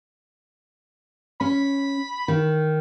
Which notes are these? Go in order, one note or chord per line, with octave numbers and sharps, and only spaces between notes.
C#4 B5
D#3